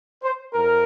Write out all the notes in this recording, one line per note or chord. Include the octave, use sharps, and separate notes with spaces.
C5
F2 A#4